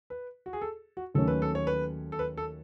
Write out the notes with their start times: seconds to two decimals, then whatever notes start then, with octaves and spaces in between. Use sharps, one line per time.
0.10 B4
0.46 F#4
0.53 G#4
0.61 A4
0.97 F#4
1.15 D#2 D#3 F#3 A3 C#4 A4
1.28 B4
1.42 A4
1.55 C#5
1.67 B4
2.12 A4
2.19 B4
2.37 A4